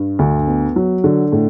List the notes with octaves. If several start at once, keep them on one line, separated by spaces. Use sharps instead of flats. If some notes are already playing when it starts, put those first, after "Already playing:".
Already playing: G2
D2
B3
F#3
D3
A2